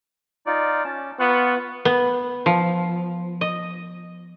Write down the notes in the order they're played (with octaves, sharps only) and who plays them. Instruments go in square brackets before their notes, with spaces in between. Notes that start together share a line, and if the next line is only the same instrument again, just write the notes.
[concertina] D#4 F4 D5
C#4 A5
[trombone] B3 [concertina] F4 C#6 F#6
[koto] B3
F3
D#5